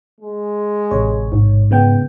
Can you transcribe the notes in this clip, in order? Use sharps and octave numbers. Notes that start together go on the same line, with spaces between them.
G#3
A1 C3 C#5
G#2
C#3 B3 G5